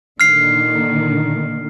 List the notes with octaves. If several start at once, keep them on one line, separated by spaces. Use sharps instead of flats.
A#2 D3 D#3 F6 C7